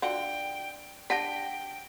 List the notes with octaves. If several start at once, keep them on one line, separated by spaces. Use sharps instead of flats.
D3 F4 F#4 G5
D4 G4 F#5 G5 A5 A#6